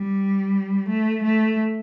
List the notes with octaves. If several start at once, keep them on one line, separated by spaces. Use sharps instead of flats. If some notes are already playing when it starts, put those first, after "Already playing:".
Already playing: G3
A3
A3